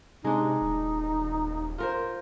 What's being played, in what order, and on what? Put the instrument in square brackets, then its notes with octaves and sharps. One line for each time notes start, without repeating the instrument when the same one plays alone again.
[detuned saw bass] C3 [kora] G#3 D4 [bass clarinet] D#4
[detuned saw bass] D#1
[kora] F4 A#4 C5